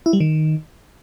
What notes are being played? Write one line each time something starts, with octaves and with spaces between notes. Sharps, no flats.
E4
G3
D#3